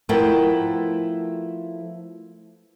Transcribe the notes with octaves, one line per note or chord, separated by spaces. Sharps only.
F3 A3 B3 E4 A#4 G5